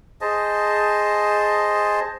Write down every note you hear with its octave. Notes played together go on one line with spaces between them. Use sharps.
G#4 C5 D#5 A5